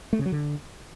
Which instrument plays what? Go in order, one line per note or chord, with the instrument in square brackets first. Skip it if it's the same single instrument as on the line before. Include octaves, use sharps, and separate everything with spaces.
[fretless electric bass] A3
C#3
F#3
D3